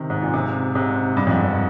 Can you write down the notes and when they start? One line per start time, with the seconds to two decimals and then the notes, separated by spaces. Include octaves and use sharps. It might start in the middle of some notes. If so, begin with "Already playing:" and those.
Already playing: C3 D#3
0.10 G#2
0.22 A#2
0.34 G#2 C3
0.75 G#2 C3
1.17 G2
1.27 F2 G#2